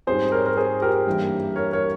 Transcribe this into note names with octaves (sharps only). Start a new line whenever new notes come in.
G#2 G3 C4 G#4 C5
A#4 C#5
A#4
G#4 C5
G4 A#4
G2 E3 A#3
A#4 C#5
A#4 C#5